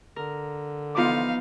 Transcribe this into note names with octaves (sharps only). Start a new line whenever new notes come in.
D3 A#4
E3 F3 B3 D#4 F4 F5 D6